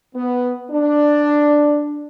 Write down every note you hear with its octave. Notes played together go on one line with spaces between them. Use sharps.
B3
D4